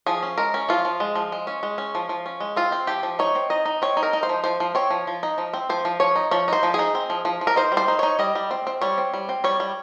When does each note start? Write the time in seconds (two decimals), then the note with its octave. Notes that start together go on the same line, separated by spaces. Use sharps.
0.06 F3 G#4
0.23 C#4
0.38 G#3 A#4
0.54 C#4
0.69 F3 F4
0.85 F3
1.00 G#3
1.15 F3
1.32 G#3
1.47 C#4
1.63 G#3
1.78 C#4
1.95 F3
2.09 F3
2.26 C#4
2.40 G#3
2.56 C4 F4
2.72 C4
2.87 F3 G4
3.03 F3
3.19 D#4 C#5
3.35 C4
3.50 D#4 D#5
3.65 D#4
3.82 C4 C#5
3.97 D#4
4.03 A#4
4.13 D#4
4.23 C5
4.29 F3
4.44 F3 C5
4.60 F3
4.75 C4 C#5
4.90 F3
5.07 F3
5.23 D#4
5.38 F3
5.53 C4
5.69 F3 C5
5.85 F3
6.00 F3 C#5
6.15 D#4
6.31 F3 C#5
6.48 D#4 C5
6.63 F3
6.74 G#4
6.79 D#4
6.95 C4
7.10 F3
7.25 F3
7.41 F3
7.47 A#4
7.56 D#4 C5
7.72 G3
7.77 C5
7.88 D#4
7.99 D#4 C#5
8.19 G3 D#5
8.35 G3
8.51 C4
8.67 C4
8.81 G3 C#5
8.98 C4
9.14 G3
9.29 C4
9.44 G3 C#5
9.60 G3